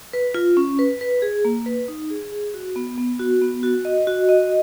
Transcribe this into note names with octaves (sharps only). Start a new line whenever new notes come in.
B4
F4
C#4
B4
B4
G#4
A#3
B4
D#4
G#4
G#4
F#4
B3
B3
F#4
B3
F#4
D#5
F#4
D#5